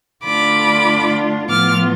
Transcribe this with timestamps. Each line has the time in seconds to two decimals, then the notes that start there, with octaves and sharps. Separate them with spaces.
0.24 D3 A3 D4 F4 B5 D6
1.49 A2 F3 B3 F4 D6 F6